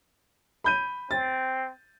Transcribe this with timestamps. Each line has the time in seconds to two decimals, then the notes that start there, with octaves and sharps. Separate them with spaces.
0.64 B5 G6 D#7
1.11 C4 A6